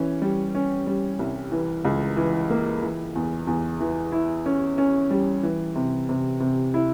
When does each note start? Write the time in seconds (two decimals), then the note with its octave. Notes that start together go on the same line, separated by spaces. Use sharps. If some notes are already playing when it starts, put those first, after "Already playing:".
Already playing: E3 C#4
0.22 G3
0.55 C#4
0.87 G3
1.19 C2
1.52 E3
1.85 C#2
2.17 E3
2.50 A#3
2.82 E3
3.15 E2
3.47 E2
3.80 E3
4.12 E4
4.46 C#4
4.78 C#4
5.11 G3
5.43 E3
5.75 C3
6.09 C3
6.40 C3
6.74 E4